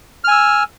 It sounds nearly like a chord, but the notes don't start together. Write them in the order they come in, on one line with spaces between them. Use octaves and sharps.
F6 G#5 E6